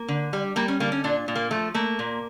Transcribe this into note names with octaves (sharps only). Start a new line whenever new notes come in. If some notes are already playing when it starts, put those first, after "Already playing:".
Already playing: A#3
D3
G3
G3 A#3
C#4
D3 A#3
C#4
A#2 D4
A#2
A#3
F3 A3
A3 A#3
A#2